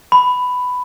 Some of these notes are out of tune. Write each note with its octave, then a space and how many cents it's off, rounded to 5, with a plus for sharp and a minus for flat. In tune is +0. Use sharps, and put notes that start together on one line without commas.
B5 +10